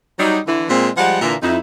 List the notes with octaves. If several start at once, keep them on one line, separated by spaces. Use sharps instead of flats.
F#3 G3 D#4
D3 E3
A#2 G#3 A#3 C4
F3 G3 G#3 F#5
A#2 D3 E3 A#3 E5 F5
F2 D#4 E4